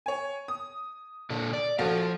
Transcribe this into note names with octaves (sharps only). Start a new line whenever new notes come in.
C#5 G#5
D#6
A#2 D3 A4
D5
A#1 F3 F#4 A4 F5